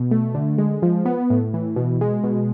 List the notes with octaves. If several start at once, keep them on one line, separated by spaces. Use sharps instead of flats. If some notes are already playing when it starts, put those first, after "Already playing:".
Already playing: B2
A3
D3
G#3
F3
B3
A2
E3
B2
G#3
B2